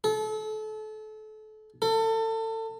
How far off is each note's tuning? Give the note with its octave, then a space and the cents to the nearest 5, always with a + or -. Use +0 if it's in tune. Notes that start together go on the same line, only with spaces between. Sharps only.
A4 -30
A4 +30